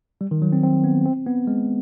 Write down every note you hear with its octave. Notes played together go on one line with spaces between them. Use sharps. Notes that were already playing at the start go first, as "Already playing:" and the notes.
G3
D#3
F#3
C4
C4
B3
C4
B3
G#3